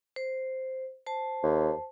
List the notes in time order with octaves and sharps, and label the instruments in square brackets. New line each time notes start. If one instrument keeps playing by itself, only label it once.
[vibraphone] C5
C5 A5
[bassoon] D#2